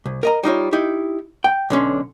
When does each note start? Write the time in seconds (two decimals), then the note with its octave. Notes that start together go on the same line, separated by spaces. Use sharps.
0.06 C2
0.23 A#4 D#5 A#5
0.43 G3 D#4 F4 C#5
0.73 D#4 E4 G4
1.44 G5
1.70 B1 D3 C#4 C6